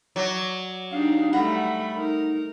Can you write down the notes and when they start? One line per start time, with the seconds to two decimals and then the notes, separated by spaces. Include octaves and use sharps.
0.16 F#3 D5
0.91 D4 D#4 G4 F5
1.33 G3 A3 F#5 A#5 B5
1.97 D#4 A#4